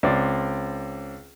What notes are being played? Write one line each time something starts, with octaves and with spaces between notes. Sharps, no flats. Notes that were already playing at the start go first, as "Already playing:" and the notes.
C#2 C4 D5